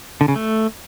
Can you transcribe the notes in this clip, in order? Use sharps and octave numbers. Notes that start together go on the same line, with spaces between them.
D3
C#3
A3